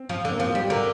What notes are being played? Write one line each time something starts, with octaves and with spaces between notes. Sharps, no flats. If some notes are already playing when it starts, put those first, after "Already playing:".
Already playing: C4
F3
D3
A#3
F3 C4
F4
G3
G4
D3 A#4